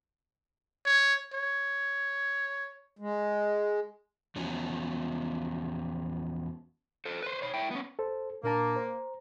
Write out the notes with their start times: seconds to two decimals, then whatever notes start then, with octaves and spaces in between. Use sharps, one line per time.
0.86 C#5
1.34 C#5
2.99 G#3
4.36 E2 F3 B3 C#4 F#4
7.05 A4 C5
7.22 B4 C5
7.42 C#5 B5
7.54 E4 G5
7.71 B3 C#4
7.99 A4 C5
8.43 A#2 A#3 D4 A5
8.76 C5 A#5